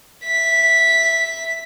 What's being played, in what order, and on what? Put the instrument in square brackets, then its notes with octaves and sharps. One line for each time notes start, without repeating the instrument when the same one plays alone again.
[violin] E5 B6